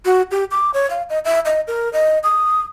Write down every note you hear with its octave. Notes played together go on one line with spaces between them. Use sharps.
F#4
G4
D6
C#5
F5
D#5
E5
D#5
A#4
D#5
D#6